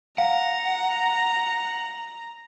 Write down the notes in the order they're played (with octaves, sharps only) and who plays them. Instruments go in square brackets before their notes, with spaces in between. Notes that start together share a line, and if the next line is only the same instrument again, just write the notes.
[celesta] F5 [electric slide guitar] F#5 [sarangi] A#5